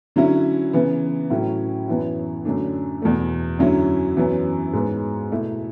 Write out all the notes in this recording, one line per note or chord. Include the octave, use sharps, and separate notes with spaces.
D3 F#3 C#4 E4
C#3 E3 B3
A2 F#3 C#4 E4
F#2 E3 B3 E4
F#2 D3 A3 D4
E2 B2 A3
F#2 D3 F#3 C#4 E4
F#2 E3 B3
G#2 G#3 B3
B2 A3 E4